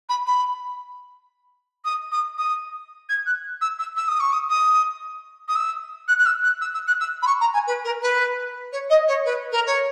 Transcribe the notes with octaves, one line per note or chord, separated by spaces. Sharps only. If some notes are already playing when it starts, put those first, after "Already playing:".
B5
B5
D#6
D#6
D#6
G#6
F#6
E6
E6
E6
D#6
C#6
D#6
D#6
D#6
E6
F#6
F#6
E6
F#6
E6
E6
F#6
E6
B5
C#6
A#5
G#5
B4
A#4
B4
C#5
D#5
C#5
B4
A#4
C#5